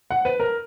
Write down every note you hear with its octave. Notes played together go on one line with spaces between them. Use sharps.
F#5
B4
A#4